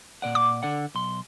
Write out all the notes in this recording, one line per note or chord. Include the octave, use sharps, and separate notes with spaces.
A#2 D5 F#5
D6
D3 D5 F#5
B1 C6